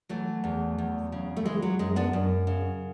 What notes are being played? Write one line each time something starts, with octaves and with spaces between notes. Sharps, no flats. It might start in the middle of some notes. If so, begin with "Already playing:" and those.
E3 F#3 A3
E2
E2
C#3
A3
E3 G#3
F#3
F#2 G#3
B3 D4
F#2
C#3